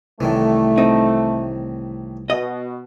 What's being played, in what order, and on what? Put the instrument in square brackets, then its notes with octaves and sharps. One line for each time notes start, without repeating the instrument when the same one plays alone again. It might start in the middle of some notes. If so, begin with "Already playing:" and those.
[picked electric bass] C2 [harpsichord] A2 D#3 E3 [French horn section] A3
[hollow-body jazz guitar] C4 D#4
[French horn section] B2 [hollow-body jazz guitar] D#5